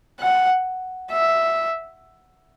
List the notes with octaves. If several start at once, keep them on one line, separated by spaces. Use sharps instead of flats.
F#5
E5